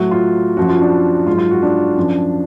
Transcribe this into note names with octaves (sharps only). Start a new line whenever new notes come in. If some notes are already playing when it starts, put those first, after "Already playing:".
Already playing: A2 F#3 F#4
F4
F#2 F3 F#4
F4
D4
G#2 F#3 F4
F4
F#4
D4
F#2 F3